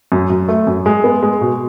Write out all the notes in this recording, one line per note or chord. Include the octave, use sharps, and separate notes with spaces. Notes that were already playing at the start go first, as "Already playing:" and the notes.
F#2
F#2
A3
F#2
G#3
B3
G#3
B2